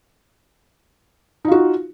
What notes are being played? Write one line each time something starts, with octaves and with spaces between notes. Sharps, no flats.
D#4 F4 F#4